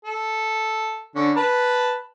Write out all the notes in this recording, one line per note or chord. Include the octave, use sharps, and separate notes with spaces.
A4
D3 C#4
B4 A5 B5